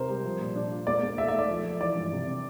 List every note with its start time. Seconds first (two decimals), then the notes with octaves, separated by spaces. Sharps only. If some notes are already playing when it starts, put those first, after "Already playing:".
Already playing: C3 A#4 C5
0.09 G3
0.25 F3
0.41 A#2
0.56 D4
0.71 F4
0.87 A#3 D5
1.03 A#3
1.18 A3 E5
1.28 E5
1.34 A3 D5
1.49 F3
1.65 F3
1.80 E3 D5
1.95 G2
2.12 C3
2.27 C4